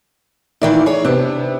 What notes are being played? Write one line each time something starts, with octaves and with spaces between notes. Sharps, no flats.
A#2 D#3 E3 E4 D5
G#4 C#5
C3 B3 D4